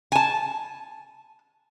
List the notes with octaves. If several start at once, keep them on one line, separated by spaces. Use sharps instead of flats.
G#5 A5